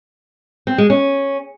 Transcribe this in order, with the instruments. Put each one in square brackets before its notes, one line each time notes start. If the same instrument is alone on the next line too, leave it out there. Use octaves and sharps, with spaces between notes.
[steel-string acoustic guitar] C4
G#3
C#4